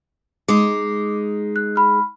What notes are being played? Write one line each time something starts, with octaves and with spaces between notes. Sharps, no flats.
G#3 D#4 D6
F#6
B5 F6